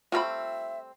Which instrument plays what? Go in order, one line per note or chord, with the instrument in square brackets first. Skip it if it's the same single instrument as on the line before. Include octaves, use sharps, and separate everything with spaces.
[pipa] G3 A3 C4 [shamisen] F4 B5 [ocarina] E5